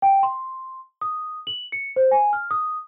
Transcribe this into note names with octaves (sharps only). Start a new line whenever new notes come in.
G5
C6
D#6
F#7
C#7
C5
G#5
F6
D#6